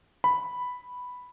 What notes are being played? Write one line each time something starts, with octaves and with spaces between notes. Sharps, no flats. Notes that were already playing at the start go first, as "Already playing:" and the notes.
B5